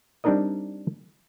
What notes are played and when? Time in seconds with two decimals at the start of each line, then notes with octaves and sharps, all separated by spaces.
0.24 G3 C4 D4 D#4 A#4 D#5